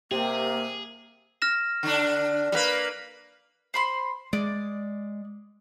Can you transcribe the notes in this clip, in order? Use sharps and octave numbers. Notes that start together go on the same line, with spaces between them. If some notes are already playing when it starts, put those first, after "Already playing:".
C3 A#3 G4 G#4
F6 A#6 E7
D3 D4
G3 A#3 B4
C5 B5 C6
G#3 D5